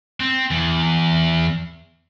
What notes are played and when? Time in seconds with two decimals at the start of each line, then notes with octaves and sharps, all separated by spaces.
0.20 C4
0.51 E2